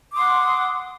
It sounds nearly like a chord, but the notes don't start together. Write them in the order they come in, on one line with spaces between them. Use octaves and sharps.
D6 D#6 C6 F#5